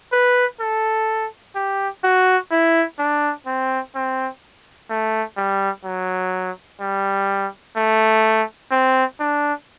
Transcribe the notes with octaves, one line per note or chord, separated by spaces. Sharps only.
B4
A4
G4
F#4
E4
D4
C4
C4
A3
G3
F#3
G3
A3
C4
D4